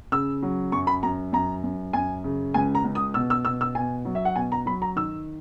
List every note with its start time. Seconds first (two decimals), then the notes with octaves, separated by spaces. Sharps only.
0.12 C#3 E6
0.42 F#3
0.72 F#2 C#6
0.87 B5
1.03 F#2 A#5
1.33 F#2 A#5
1.63 F#2
1.93 F#2 G#5
2.24 C#3
2.54 C#2 G#5
2.75 A#5
2.84 C#2
2.95 D#6
3.14 B2 E6
3.30 E6
3.45 B2 E6
3.61 E6
3.75 B2 G#5
4.05 F#3
4.15 E5
4.25 F#5
4.36 B2 G#5
4.52 A#5
4.66 F#3 B5
4.82 A#5
4.96 D#3 E6